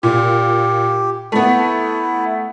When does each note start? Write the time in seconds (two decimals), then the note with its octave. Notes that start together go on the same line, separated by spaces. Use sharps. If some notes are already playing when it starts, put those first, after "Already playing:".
0.03 A#2 G4
1.32 A3 B3 E4